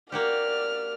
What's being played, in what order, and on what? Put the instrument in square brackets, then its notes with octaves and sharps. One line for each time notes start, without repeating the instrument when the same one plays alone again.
[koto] A#3 F#4 G4 [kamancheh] D5 F6